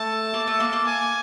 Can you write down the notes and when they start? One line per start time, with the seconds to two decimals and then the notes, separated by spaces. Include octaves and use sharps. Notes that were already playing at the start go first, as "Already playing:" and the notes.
Already playing: A3 A5
0.34 A#3
0.47 A3
0.60 A#3
0.73 A#3
0.85 G#5